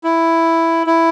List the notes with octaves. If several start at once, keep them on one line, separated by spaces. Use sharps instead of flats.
E4
E4